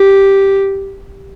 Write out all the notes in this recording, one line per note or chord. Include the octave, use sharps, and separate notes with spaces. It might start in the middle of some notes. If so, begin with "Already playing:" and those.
Already playing: G4